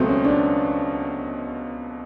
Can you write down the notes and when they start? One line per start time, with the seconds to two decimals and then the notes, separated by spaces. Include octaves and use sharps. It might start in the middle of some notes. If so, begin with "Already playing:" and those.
Already playing: C#2 B2 F#3 A3 C4
0.09 C#4
0.25 D4